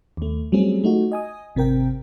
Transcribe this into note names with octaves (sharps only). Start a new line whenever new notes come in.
D#2 A3
F#3 G3 A3 C4 C#4 G#4
A3 D#4 F4 F#4
D#5 G#5 D#6
G#1 C3 C4 A#4 G5